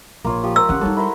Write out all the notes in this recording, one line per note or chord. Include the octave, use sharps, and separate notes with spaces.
A#1 A#3 F4 C#5
F3 G4
F4 A#4 E6
D#3 C#4 F#5
G3 D#4 A4 C#5
E4 A#4 C5